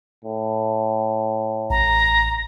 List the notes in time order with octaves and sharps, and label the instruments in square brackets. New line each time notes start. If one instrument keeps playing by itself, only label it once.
[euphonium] A2
[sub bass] A1 [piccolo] A#5